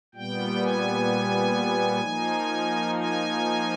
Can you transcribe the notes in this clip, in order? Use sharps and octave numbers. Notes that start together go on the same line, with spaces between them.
A#2 G3 B3 G5
G#5
F3 A#3 D#4
G#5